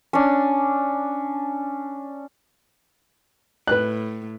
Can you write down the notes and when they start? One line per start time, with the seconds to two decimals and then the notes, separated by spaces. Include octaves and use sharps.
0.13 C#4 D4
3.67 A2 B4 F#6